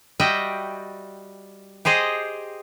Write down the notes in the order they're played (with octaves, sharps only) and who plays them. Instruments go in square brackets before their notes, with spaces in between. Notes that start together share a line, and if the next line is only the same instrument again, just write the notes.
[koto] G3 F#4 D#5 E5 G5
G4 G#4 C5 D#5